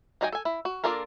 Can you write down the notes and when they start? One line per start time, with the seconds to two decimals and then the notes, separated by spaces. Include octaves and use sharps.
0.21 F#3 D#4 D#5 G5 G#5
0.32 A4 G#5
0.45 E4
0.65 F#4
0.84 A#3 D4 F4 A4 A#4